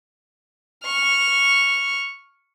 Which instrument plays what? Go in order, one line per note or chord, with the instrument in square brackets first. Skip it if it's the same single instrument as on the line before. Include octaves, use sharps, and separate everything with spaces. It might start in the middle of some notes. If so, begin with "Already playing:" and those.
[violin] C#6 F6